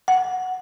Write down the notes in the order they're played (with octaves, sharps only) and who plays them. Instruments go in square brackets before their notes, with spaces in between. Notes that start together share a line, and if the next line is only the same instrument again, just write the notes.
[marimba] F#5